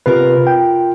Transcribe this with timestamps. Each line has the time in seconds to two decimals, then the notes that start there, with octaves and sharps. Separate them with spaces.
0.06 C3 F4 A#4 B4
0.47 G5